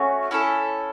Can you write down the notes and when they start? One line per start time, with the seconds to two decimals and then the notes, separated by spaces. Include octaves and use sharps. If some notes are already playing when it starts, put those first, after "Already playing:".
Already playing: A3 C#4 F#4
0.31 C#4 E4 A4